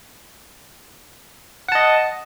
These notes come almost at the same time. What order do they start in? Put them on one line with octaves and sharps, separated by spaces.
F#5 A5 D#5